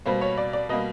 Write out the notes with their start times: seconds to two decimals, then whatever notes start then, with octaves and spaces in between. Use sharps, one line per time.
0.06 B2 G3 A#3 C5
0.21 C#5
0.38 D5
0.53 D5
0.69 B2 G3 A#3 D#5